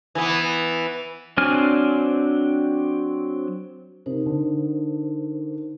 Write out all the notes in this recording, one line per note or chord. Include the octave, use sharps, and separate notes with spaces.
E3 B3
F#3 C4 D4 G#5 F6
C3 D#4 A#4 C5
D3